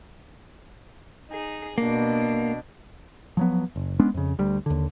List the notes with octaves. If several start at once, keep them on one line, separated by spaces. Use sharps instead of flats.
D#4 G#4
B2 A#3 D4
F3 F#3 B3
F#1
G#3 B3 C#4 D4
F2 C#3
D2 G3
D#2 D3